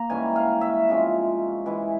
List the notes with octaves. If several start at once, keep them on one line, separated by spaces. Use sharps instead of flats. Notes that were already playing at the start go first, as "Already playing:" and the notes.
Already playing: A#3 A#5
G#2 E3 G3 C#4 G#5
F5
E5
C3 F3 G#3 C#4
E3 G#3 E4